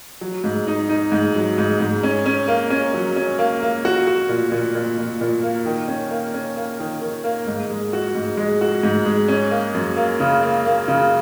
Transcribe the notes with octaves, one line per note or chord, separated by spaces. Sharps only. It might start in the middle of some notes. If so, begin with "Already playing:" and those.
F#3
G#2
D#4
D#4
G#2
F#3
G#2
G#2
C#4
C#4
A#3
C#4
F#3
C#4
A#3
A#3
F#4
F#4
A#2
A#2
A#2
A#2
A#2
A#3
D#3
C#4
A#3
C#4
A#3
D#3
D#3
A#3
G#2
G#3
F#4
G#2
G#3
F#4
G#2
G#3
C#4
A#3
F#2
A#3
C#3
A#3
A#3
C#3